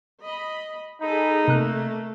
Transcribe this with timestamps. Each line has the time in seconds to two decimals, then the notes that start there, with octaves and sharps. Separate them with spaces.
0.24 D#5 B5
1.02 D#4 G#4 A4 B5
1.48 C3 A3 A#3 A#5 F#6